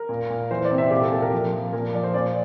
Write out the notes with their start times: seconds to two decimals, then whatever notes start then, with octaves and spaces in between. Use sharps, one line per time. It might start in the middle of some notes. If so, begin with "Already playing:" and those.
Already playing: A#4
0.09 A#2
0.30 A#2
0.51 E3 C5
0.65 D5
0.71 C3
0.78 E5
0.91 A#2 G4
1.01 A4
1.12 A#2 A4
1.22 A#4
1.32 F3
1.52 F3
1.73 A#2 A#4
1.93 F3 D5
2.03 C5
2.14 A#2 D5